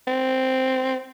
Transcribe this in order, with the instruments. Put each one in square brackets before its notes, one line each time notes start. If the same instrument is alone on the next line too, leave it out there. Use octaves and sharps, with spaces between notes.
[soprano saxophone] C4